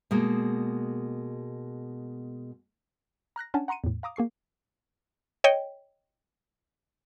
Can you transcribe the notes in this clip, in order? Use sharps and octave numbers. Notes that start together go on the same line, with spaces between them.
B2 G#3 A#3
A#5 F6 F#6 A#6
C#4 D4 F#5 G#5 A5
F#5 A#5 C6 C#7 D#7
E2 A2
F5 A#5 D6 D#6
A#3 G#4 C#6 C7
C#5 D#5 G5